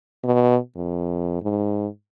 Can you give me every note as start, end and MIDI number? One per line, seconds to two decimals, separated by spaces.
0.24 0.57 47
0.76 1.37 41
1.42 1.87 44